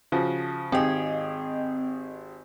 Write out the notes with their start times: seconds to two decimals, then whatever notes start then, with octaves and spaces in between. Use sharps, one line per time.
0.12 C#3 F3 F#4
0.72 G#1 C4 G4 G#4 D#5